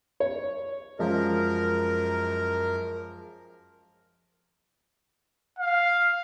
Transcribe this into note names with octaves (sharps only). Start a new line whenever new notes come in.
C#5
F#2 F3 G#3 A#4
F5